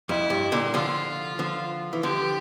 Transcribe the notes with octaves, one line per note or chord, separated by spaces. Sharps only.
F2 E4
G2
A#2 D3
D3 F3 F4
D3 F3
E3
D3 F3 G4